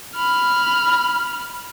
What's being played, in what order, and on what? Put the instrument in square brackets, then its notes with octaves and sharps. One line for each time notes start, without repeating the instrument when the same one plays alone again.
[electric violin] B5 F6